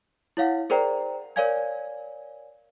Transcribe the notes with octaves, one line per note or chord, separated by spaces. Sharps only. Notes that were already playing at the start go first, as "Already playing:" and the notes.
E4 C#5 F5 F#5
G#4 A#4 C5 D5 G5 A#5
A#4 C#5 D5 F5 G#5 G#6